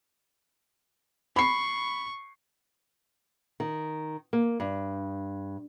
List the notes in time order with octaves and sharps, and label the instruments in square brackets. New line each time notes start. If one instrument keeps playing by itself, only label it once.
[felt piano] B5 C7 [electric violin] C#6
[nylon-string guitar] D#3
A#3
G2